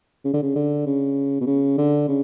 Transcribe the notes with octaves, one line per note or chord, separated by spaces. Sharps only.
C#3
D3
C#3
D3
C#3
B2
C#3
D3
C#3